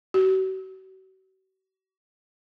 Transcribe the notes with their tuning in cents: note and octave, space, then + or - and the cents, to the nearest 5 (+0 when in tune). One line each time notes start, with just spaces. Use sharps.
F#4 +45